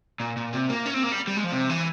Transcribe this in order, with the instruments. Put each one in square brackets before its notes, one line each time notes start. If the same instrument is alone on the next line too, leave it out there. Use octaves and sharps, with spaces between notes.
[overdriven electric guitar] A#2
A#2
C3
A#3
C#4
C4
A#3
G3
G3
G#3
F3
C3
E3